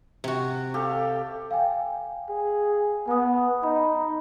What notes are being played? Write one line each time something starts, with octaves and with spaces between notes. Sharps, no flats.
C3 F#4
G4 A4 F5
F5 G5 G#5
G#4
B3 G#5 D#6
D#4 B5